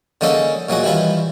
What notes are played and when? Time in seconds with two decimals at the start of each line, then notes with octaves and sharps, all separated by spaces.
0.21 D3 G#3 A#3 C#4 D#4 A4
0.69 A#2 F#3 G#3 F#4
0.83 D#3 E3 G3 E4 F4